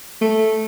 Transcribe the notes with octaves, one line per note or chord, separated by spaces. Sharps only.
A3